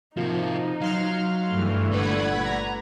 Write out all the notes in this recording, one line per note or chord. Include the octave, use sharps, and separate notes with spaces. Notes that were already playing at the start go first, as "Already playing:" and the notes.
C3 F3 A#3 D#4 F4 F#4
F#3 F5 C6 F6
G2 E3 A3
G1 A#2 G3 B4 D5 F#5 B5 G#6
A#5